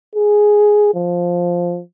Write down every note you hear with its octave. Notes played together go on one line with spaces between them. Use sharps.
G#4
F3